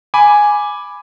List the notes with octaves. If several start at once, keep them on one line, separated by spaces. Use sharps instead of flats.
G#5 B5 D6